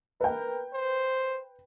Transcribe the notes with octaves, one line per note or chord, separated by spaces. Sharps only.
A#4 B4 G5
C5